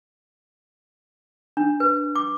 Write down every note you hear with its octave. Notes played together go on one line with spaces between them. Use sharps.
D4
B4
D6